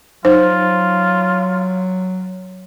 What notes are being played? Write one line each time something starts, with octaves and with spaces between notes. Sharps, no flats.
F#3 D#4 F4 C5